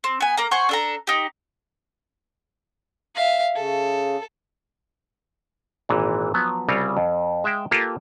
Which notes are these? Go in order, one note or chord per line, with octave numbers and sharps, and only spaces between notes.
C4
B3 G#5
A#3 A#5
C5 F#5 G#5 C#6
D4 A4 A#5
D#4 G4
E5 F5
C#3 A4
G#1 A#2 E3
F3 F#3 B3
C2 C#3 G3 C4 F4 C#5
F2
G#3 E5 F5 G5
A#3 F4 G4 A4 B4